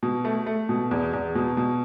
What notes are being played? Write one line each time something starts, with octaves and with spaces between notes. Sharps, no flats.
B2
A3
A3
B2
E2
E2
B2
B2